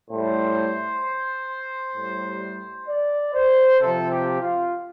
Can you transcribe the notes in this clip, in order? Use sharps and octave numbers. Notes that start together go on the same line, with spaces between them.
A2 G3 C5
A2 G3
D5
C5
C3 F3 A4
G4
F4